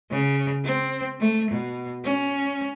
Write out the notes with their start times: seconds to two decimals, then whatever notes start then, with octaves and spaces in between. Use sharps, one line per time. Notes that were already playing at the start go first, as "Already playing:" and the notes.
0.11 C#3
0.65 C4
1.20 A3
1.51 B2
2.05 C#4